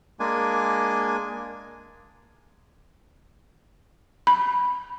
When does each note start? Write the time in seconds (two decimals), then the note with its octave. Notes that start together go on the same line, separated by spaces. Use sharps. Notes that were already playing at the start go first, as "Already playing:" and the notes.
0.20 G#3 A#3 D4 G#5
4.27 B5